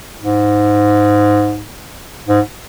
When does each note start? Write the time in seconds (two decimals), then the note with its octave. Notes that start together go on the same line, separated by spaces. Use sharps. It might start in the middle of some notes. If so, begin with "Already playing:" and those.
0.22 G#2
2.28 G#2